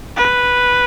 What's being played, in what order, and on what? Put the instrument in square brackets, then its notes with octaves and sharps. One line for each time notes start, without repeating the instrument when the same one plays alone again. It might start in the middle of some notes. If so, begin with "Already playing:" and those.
[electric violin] B4